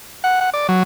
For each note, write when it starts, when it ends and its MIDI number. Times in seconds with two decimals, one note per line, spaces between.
0.24 0.41 78
0.41 0.50 78
0.54 0.67 74
0.69 0.83 54